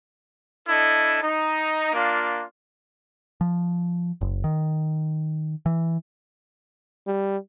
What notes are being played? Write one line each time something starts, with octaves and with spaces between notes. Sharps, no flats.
D4 E4 A4 D#5
D#4
A#3 D4 F4
F3
F#1
D#3
E3
G3